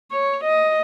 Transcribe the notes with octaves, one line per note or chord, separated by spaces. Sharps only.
C#5
D#5